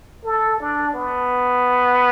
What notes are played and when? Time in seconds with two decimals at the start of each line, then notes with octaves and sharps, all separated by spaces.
0.25 A4
0.60 D4
0.94 B3